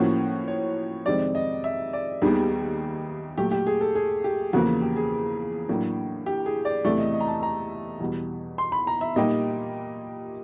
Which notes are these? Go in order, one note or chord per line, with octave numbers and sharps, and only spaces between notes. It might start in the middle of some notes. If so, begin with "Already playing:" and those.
Already playing: A2 F3 A#3 C#4 F#4
C#5
F2 C3 D#3 G#3 C4 D5
D#5
E5
D5
D#2 D#3 G3 B3 G#4
A#2 F#3 A3 G4
G4
G#4
A4
G#4
G4
E2 C#3 F3 A#3 F#4
G4
G#4
A2 F#3 A#3 D4
G4
G#4
D5
E2 C3 E3 A3 D5
D#5
D#5
A#5
A5
A#5
E2 B2 G3
C6
B5
A#5
E5
A#2 G3 A#3 D#4 G4 D#5